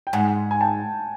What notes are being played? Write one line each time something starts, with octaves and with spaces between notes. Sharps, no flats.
G5
G#2 F#5 G#5
G#5
G5 A5